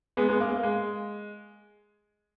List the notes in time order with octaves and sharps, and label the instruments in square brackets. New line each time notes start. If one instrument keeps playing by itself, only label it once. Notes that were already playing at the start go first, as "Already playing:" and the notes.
[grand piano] G#3 B3
G#3 B3
A#3
A#3
G#3